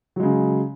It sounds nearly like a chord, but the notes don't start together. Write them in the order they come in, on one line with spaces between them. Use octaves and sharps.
F#3 G#3 C#3